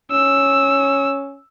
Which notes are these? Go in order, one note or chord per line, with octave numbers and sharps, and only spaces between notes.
C#4 E6